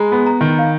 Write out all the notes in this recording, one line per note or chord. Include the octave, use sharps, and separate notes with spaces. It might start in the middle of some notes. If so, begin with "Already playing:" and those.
Already playing: G#3 A#5 B5
B3
A#5
D#3
F5